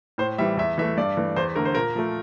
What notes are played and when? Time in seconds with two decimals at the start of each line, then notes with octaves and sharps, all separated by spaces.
0.18 A2 C5
0.38 E3 G3 E5
0.57 E2 E5
0.78 E3 A3 E5
0.97 G2 D5
1.17 E3 A3
1.36 E2 C5
1.56 D3 A3 A#4
1.65 C5
1.75 A#2 A#4
1.95 F3 A3